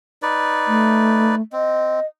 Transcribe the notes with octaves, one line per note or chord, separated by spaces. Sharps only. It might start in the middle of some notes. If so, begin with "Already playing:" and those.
D#4 B4 D5
A3
C4 D#5